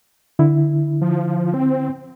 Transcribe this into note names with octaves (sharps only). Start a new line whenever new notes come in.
D3 E4
F3
C4